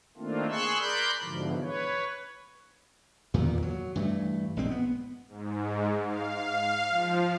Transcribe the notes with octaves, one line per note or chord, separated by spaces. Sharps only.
D#3 A3 A#3 C4 D4 F4
G#4 C6 C#6 E6 F#6
A#4 D5 B5 C6 F#6 G6
G#2 B2 D3 E3 F3
B4 C#5
E2 G2 A#2 D#3
F#3
G2 E3 A3
A#1 G#3 C4
B3
G#2
F5
F3